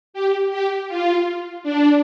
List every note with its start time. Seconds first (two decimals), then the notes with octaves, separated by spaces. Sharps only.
0.14 G4
0.51 G4
0.88 F4
1.63 D4